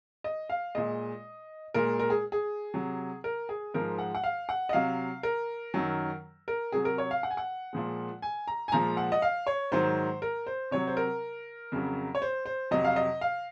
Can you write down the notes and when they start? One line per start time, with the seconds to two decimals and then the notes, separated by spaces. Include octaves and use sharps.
0.24 D#5
0.50 F5
0.75 A#2 G#3 D#5
1.74 A#2 G#3 A#4
1.99 A#4
2.10 G#4
2.32 G#4
2.74 C3 F#3
3.24 A#4
3.49 G#4
3.74 G#2 F3 G#3 A#4
3.99 F#5
4.15 F#5
4.24 F5
4.49 F#5
4.69 D#5
4.73 C3 F#3 F5
5.23 A#4
5.74 F#2 D#3 F#3
6.48 A#4
6.72 C3 F#3 G#4
6.85 A#4
6.98 C#5
7.11 F5
7.23 F#5
7.31 G#5
7.37 F#5
7.73 A#2 F3 G#3
8.22 G#5
8.47 A#5
8.68 G#5
8.72 A#2 F3 G#3 A#5
8.97 F#5
9.12 D#5
9.22 F5
9.47 C#5
9.72 G#2 D#3 F#3 C5
10.22 A#4
10.47 C5
10.71 C3 F#3 C#5
10.87 C5
10.97 A#4
11.72 F2 C#3 F#3
12.15 C#5
12.22 C5
12.46 C5
12.71 F2 C3 F#3 D#5
12.85 F5
12.96 D#5
13.21 F5